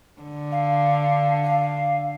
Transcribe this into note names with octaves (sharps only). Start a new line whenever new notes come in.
D3
F5
F5